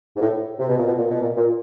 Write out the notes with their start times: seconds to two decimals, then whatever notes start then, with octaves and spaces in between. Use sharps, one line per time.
0.16 G#2
0.21 A2
0.59 C3
0.68 B2
0.77 A#2
0.86 B2
0.97 A#2
1.10 B2
1.22 A#2
1.37 A#2